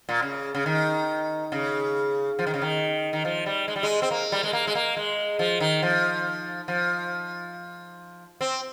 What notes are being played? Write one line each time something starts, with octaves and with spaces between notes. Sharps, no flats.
A#2
C#3
C#3
D#3
C#3
F3
D#3
C#3
D#3
D#3
F3
G3
G#3
G3
G#3
C4
A#3
G3
G#3
A#3
G#3
A#3
G#3
F3
D#3
F3
F3
C4